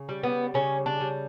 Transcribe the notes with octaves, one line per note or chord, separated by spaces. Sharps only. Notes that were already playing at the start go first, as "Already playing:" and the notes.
Already playing: C#3
G3
B3
C#3 C#4
D4
G3